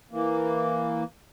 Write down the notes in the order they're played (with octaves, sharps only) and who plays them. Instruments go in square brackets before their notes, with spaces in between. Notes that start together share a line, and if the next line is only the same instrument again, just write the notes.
[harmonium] E3 A#3